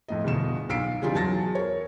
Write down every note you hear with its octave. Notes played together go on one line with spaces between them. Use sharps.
F2 A2 D#5
G1 E2 B2 E7
B1 F5 E6 B6 C7 D7
C#3 E3 G3 D#4 F4 G#4
E2 F#3 A5 A6 A#6
A#4 C#5